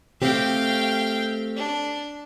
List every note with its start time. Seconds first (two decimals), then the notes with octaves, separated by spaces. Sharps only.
0.22 A3 C4 G4 F5 G5
1.56 D4